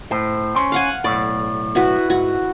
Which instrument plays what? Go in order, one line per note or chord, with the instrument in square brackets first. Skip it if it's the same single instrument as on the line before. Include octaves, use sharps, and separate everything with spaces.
[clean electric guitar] A2 [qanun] C5
[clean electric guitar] C#4 C6
[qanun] F5 F#5 G#5
[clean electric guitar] B1 A2 [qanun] D5
[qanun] E4 F#4 B4
[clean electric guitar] G#2 [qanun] F#4